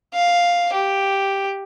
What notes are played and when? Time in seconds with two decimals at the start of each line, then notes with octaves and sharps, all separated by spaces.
0.14 F5
0.73 G4